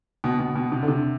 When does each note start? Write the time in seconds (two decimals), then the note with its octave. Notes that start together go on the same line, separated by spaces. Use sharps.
0.24 B2
0.40 B2
0.56 B2
0.72 C3
0.83 D3
0.88 C3